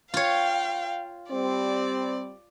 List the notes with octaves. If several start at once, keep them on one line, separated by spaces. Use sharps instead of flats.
F4 C#5 F5 G5
G3 C4 D5